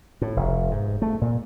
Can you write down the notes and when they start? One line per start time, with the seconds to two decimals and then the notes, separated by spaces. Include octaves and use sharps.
0.22 A2
0.36 F1
0.71 G#2
1.02 A3
1.21 A#2